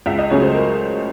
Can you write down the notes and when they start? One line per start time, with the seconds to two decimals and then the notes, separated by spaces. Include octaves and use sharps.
0.06 C#2 E5
0.19 D#5
0.30 C#3 F#3 A3 C#5
0.42 C5
0.54 A#4